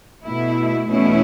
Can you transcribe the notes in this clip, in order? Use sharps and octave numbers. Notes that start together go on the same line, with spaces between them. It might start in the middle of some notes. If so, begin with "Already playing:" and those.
B2 A3 E4
E2 B2 A3 C#4 E4